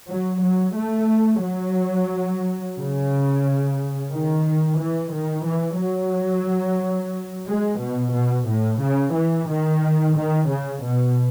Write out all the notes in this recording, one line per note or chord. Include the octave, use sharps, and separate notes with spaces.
F#3
F#3
A3
F#3
C#3
D#3
E3
D#3
E3
F#3
G#3
B2
B2
A2
C#3
E3
D#3
D#3
C#3
B2